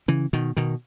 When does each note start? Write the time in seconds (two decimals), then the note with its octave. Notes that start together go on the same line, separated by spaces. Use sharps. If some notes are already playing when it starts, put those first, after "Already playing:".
0.08 C#3 E3
0.33 B2 D#3
0.57 B2 D#3